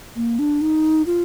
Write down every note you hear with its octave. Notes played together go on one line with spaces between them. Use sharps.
A#3
D4
D#4
F4